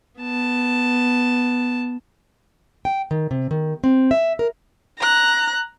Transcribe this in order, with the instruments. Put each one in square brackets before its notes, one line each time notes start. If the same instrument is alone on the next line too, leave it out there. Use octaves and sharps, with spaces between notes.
[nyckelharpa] B3 A5
[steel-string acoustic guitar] G5
D#3
C3
D#3
C4
E5
A#4
[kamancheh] A#5 F#6